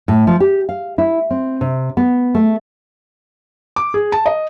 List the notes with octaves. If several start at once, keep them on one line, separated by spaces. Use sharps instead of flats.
A2
F3
G4
F5
E4
C4
C3
B3
A3
D6
G#4
A5
D#5